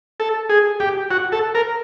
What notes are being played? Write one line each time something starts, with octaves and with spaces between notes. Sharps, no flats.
A4
G#4
G4
F#4
A4
A#4